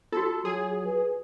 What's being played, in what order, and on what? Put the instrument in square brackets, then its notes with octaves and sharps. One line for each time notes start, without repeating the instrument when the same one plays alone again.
[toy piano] F4 F#4 [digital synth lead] A4
[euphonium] F#3 [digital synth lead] G#4
[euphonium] B4